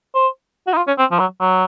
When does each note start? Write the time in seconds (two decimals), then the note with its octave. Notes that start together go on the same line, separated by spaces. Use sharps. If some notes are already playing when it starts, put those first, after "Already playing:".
0.15 C5
0.67 F#4
0.73 D#4
0.77 F4
0.88 C#4
0.98 C4
1.11 F3
1.19 F#3
1.41 F#3